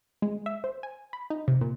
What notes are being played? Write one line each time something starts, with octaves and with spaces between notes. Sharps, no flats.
G#3
E5
C5
G#5
B5
D#4
C3
A#2